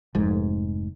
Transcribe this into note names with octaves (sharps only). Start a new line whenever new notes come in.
F1 G#2